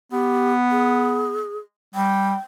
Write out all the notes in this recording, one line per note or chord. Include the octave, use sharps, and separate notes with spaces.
B3 G4
G#4
G3 G5